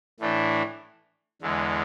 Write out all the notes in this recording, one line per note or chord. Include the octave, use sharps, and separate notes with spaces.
A2 E3 A3 D4
E2 D3 G#3